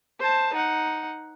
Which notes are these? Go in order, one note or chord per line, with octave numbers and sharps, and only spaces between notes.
C5 A5
D#4 F#5